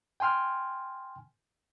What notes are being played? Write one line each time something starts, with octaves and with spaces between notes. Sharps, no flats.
G5 G#5 C6 F6